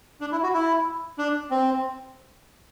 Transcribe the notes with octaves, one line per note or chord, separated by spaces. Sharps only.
D4
E4
F#4
E4
D4
C4